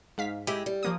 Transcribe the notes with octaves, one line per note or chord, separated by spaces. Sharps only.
G#2 F5 B6
G#3 E4 G4
G3
F3 A#3 D#6